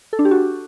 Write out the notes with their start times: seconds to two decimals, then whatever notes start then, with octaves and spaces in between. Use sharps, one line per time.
0.13 A4
0.19 D4
0.25 G4
0.31 F#4